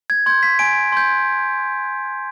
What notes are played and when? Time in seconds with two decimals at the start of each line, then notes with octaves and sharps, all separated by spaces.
0.10 G#6
0.26 C6 G6 G#6
0.43 B6
0.59 G#5 D7
0.92 C6 G6